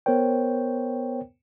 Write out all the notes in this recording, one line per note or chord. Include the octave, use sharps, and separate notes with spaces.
B3 A#4 C5 C#5 G5